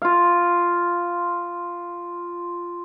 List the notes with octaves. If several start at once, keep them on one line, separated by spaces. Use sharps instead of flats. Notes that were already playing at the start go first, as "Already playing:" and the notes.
F4 F5